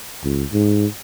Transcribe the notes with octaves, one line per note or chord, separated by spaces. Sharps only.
C#2
G#2